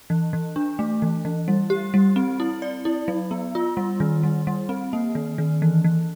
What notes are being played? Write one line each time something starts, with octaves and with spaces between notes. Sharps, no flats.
E3
E3
D4
A3
E3
E3
G3
G4
G3
C4
E4
D5
E4
F#3
B3
F4
G3
D#3
G3
G3
C4
A#3
D#3
D#3
E3
E3